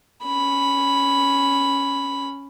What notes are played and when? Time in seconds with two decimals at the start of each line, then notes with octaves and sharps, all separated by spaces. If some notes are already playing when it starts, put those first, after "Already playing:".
0.24 C#4 B5